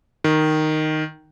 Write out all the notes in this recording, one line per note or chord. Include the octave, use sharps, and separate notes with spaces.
D#3